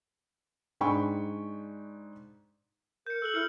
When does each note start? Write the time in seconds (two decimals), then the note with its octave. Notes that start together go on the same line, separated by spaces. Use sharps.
0.81 G#2 D4 G5 G#5 B5 C#6
3.07 A#4 G6 C#7
3.22 A4 E6 F#6 F#7
3.35 E4 F6 C#7